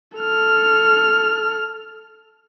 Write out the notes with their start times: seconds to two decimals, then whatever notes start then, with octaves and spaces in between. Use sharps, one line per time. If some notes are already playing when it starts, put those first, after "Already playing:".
0.17 A4 F6